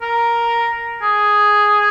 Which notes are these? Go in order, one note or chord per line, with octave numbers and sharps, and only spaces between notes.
A#4
G#4